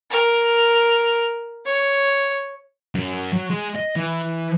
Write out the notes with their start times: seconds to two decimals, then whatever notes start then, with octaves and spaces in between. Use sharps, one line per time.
0.11 A#4
1.66 C#5
2.95 F#2
3.32 F#3
3.50 G#3
3.75 D#5
3.96 E3